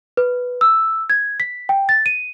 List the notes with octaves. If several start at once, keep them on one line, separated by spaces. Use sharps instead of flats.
B4
E6
G#6
B6
G5
A6
D#7